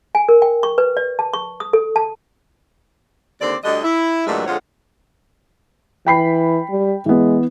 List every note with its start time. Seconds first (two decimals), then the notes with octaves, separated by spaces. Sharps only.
0.15 G#5
0.29 A#4
0.42 G5
0.63 C#6
0.78 B4
0.97 D5
1.19 A5
1.34 C#6
1.60 D#6
1.73 A4
1.96 A5
3.40 D#2 D3 C4 D5
3.64 D2 D3 G3 D4 D#5
3.83 E4
4.27 G2 A#2 E3 F#3 G#3 A3
4.46 F2 D3 G#3 F4 C#5 F#5
6.06 E3 G5 B5 C7
6.70 G3
7.06 E3 G#3 B3